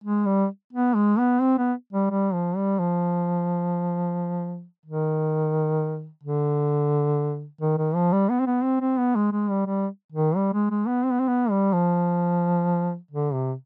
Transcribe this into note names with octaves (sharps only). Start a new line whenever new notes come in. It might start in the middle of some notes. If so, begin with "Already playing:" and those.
G#3
G3
B3
G#3
B3
C4
B3
G3
G3
F3
G3
F3
D#3
D3
D#3
D#3
F3
G3
B3
C4
B3
C4
C4
B3
G#3
G#3
G3
G3
D#3
G3
G#3
G#3
B3
C4
B3
C4
B3
G3
F3
D3
C3